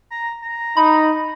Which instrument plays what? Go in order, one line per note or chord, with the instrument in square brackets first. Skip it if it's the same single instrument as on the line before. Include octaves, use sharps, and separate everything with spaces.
[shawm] A#5
A#5
[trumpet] D#4 [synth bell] B5